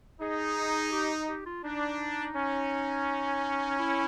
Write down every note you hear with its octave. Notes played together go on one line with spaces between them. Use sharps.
D#4 G#4
G4
G4
F4
D4 D#4
C#4
E4